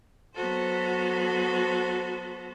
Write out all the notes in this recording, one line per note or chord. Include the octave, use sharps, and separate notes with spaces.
F#3 B3 F#4 A4 C5